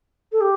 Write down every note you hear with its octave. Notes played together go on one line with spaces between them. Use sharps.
A4
G4